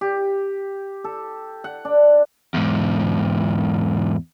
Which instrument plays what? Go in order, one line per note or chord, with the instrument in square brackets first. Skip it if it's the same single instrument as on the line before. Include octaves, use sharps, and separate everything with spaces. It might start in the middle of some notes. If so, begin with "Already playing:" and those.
[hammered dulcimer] G4
A4
F#5
D4
[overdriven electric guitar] E2 G#2